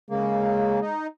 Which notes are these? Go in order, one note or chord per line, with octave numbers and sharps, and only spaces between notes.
C#3 G#3 A#3
D#4